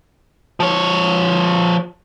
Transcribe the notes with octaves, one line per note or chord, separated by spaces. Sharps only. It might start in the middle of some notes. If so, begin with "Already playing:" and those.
F3 C#5